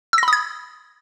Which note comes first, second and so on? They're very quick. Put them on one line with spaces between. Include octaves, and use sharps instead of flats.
E6 A#6 B5 D#6 G#6